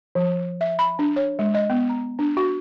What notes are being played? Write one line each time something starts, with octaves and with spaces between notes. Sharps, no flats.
F3
E5
B5
D4
C#5
G#3
D#5
B3
A#5
D4
F#4